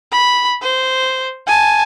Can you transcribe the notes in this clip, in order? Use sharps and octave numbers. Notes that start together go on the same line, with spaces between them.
B5
C5
G#5 A5